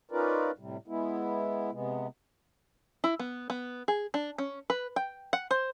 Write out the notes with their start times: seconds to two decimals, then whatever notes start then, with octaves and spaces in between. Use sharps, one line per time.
0.11 C#4 D#4 F4 A#4 B4 D5
0.58 A2 C3 G3
0.88 G#3 B3 E4
1.72 C3 G#3 B3
3.04 E4
3.19 B3
3.50 B3
3.88 G#4
4.14 D4
4.38 C#4
4.70 B4
4.96 G5
5.33 F#5
5.51 C5